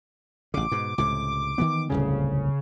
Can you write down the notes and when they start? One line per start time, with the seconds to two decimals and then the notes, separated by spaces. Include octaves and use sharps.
0.54 A1 C#3 D6
0.72 G#2 B2
0.98 C#2 A2 C3 D6
1.58 D#3 E3 B3
1.89 D1 C2 F2 C#3